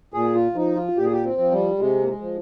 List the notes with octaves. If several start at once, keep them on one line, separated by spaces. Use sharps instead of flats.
A#2 G#4
F4
F3 D#4
F4
A#2 G4
G#4
G4
C4
F3
G3
C3 G#3
A#3
G#3
F3